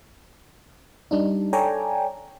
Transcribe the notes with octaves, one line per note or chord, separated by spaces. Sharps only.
G3 D4 D#4
A4 C#5 D5 G5 G#5 A#5